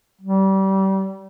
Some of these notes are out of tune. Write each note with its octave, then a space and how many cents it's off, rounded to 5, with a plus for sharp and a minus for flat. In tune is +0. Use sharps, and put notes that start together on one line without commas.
G3 -30